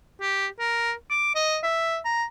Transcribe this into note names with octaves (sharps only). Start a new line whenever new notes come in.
G4
A#4
D6
D#5
E5
A#5